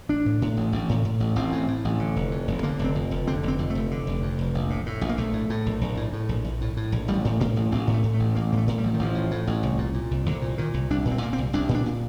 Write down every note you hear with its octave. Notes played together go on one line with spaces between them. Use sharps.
A1 D4
A2
A2
A1
A1
A2
A2
A1
A1 C4
A2
A2
A1
D3
F1
F2
F1
D3 A#3
F1
C4
F2
F1
D3 C4
F1 C4
F2
F1 A3
D3
F1
F2
F1
A#1
A2
A2
A#1
A#3
A#1 A3
A2
A2
A#1
A#1
A2
A2
A#1
A#1
A2
A2
A#1
A1 G3
A2
A2 A#3
A1
A1 C4
A2
A3
A2
A3
A1
A1 A#3
A2 A#3
A3
A2
G3
A1 F3
D#3
A1 F3
A2
A2
A1
C2
A#2
A#2
C2
C2 D3
A#2
A#2 D#3
C2
C2 D4
A#2
C4
A#2 A#3
C4
C2
C2 D4
A#2
D4
A#2